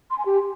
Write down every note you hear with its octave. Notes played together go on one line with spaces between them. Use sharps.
C6
G#5
G4